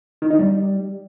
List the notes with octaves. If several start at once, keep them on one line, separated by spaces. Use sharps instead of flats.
D#3
D#4
G3